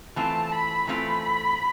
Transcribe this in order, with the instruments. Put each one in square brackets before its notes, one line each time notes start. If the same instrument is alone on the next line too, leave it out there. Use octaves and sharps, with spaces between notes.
[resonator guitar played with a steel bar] E3 A3 C4 F4 [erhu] A5
[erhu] B5
[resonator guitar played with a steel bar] E3 A3 C4 F4 [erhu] B5